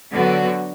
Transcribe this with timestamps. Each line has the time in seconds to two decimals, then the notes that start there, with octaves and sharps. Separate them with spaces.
0.13 D3 F#3 B3 F#4